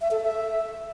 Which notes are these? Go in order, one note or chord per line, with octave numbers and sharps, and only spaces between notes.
E5
A4
E5